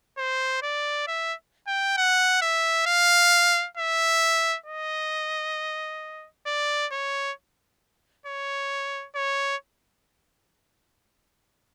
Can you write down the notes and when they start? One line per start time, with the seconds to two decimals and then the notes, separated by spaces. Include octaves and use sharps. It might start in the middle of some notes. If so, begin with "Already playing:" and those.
0.18 C5
0.62 D5
1.07 E5
1.67 G5
1.97 F#5
2.42 E5
2.86 F5
3.77 E5
4.66 D#5
6.46 D5
6.92 C#5
8.26 C#5
9.15 C#5